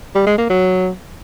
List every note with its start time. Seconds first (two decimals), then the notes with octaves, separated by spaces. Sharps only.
0.15 G3
0.27 G#3
0.38 A#3
0.50 F#3